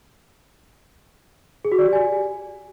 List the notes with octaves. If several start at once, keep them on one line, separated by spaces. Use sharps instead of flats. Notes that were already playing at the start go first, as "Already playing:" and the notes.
G#4
F#4
D5
G4
G#5